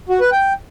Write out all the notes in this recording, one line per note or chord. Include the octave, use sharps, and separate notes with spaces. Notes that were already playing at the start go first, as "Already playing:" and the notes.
F#4
B4
G5